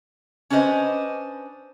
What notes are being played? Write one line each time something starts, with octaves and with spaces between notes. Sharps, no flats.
C#4 D4 B4 C5 D#5